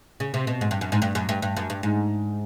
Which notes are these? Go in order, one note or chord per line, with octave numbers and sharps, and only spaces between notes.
C#3
C3
B2
G#2
G2
F#2
G#2
G2
F#2
G2
G2
F#2
G2
G#2